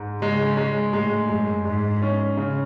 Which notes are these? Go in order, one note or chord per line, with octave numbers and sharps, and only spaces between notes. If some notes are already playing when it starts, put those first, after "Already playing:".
Already playing: G#2 G#3
C#3 G#3
G#3
A2 G#3
F#2 G#3
G#2 G#3
C#4
C#3